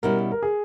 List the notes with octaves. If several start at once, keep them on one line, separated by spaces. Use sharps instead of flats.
B2 G3 C#4 E4 A#4
A#4
G#4